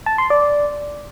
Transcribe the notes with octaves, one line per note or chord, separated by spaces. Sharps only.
A5
C6
D5